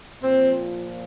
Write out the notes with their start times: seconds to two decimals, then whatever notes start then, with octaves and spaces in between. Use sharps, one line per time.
0.23 A#2 F3 C4